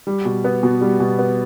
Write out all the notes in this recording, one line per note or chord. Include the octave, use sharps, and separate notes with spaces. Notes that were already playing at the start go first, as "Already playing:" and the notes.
G3
B2
B3
B2
G3
B2
B3